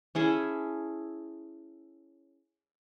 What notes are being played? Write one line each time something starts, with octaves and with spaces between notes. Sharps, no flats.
C#4 E4 G#4 A4